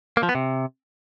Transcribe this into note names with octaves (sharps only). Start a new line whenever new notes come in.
A#3
F3
B3
C3